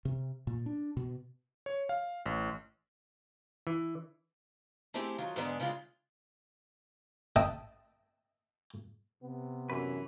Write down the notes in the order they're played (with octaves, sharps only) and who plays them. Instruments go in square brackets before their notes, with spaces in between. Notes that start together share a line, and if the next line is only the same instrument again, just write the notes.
[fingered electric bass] C3
A#2
D4
B2
[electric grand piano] C#5
F5
A1
[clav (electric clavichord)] E3
[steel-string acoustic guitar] A3 C4 E4 G4 G#4
D#3 F#3 F4
G#2 D3 G#3 B3 D4 G#4
C#3 G#3 D4 F4
[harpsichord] D#5 E5 G5 A5
[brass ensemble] C3 [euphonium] B3
[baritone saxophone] F#2 [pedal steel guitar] E3 B4